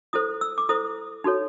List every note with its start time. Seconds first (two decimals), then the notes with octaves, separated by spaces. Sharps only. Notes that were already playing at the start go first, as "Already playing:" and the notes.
0.13 E4 A4 C5 D#6
0.41 E6
0.58 D6
0.69 E4 A4 C5 D#6
1.24 D#4 F#4 A4 C#5